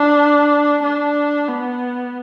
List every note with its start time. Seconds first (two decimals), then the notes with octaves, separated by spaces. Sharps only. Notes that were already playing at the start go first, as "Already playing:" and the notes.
Already playing: D4
0.83 D4
1.47 B3